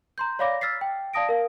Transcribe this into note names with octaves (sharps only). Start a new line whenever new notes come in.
A#5 C6 G6
C#5 D5 F5 B5 D6 A#6
E6 F6 A6 B6 C7
G5
D5 F5 A5 D#6 A#6 D7
A#4 F5